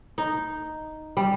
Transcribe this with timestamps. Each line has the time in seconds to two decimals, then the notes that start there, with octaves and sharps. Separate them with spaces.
0.18 D#4
1.17 G3